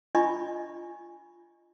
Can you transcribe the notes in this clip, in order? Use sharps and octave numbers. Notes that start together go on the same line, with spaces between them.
D4 F4 D#5 G#5 B5 C#6